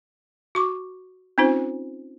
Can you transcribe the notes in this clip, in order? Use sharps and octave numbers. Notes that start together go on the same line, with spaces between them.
F#4 C#6 D6
C4 C#4 D#4 F4 C5